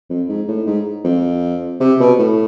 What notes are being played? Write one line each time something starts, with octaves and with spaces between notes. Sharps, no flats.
F2
G#2
A2
G#2
F2
C3
B2
A2